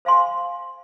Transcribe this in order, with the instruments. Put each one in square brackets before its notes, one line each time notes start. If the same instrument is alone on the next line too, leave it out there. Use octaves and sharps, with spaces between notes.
[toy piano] C5 F5 G#5 C6